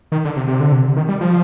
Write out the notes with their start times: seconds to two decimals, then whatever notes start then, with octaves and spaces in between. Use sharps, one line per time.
0.12 D#3
0.25 D3
0.36 C3
0.48 C3
0.60 D3
0.72 C3
0.96 D#3
1.09 G3
1.21 F3